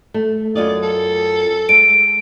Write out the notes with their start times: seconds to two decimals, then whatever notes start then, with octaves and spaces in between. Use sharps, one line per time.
0.14 A3
0.55 F#2 F4 D5 D#5
0.83 A4
1.69 G#3 D7